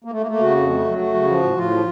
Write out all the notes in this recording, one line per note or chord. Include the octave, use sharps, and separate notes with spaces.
A#3
A3
A#3
A3
A#3
C#3 F#4
F2
A3
F#3
A3 F#4
C#3
F3
A2
A2 F4
F3